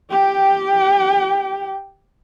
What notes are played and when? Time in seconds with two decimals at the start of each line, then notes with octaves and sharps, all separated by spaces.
0.11 G4 G5